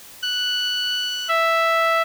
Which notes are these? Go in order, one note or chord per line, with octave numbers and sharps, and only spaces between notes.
F#6
E5